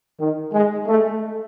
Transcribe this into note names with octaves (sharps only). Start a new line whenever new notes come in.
D#3
G#3
A3